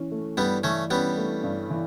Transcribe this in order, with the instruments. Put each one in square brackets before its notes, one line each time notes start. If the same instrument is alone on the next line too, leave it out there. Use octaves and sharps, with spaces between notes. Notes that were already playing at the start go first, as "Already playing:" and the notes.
Already playing: [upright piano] E3 C#4
A3
[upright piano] G2 [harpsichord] G3 B3
[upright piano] E3 [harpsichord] A3 C#4
[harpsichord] G3 B3 [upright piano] C#4
[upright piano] A3
G2
E3